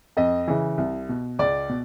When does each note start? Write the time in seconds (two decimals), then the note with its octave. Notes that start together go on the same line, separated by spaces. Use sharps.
0.17 F2 D#5
0.48 C#3 E3
0.78 C2
1.09 B2
1.39 C#2 D5
1.69 B2